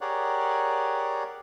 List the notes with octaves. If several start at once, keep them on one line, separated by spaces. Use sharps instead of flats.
G4 G#4 A#4 C#5 D5 F#5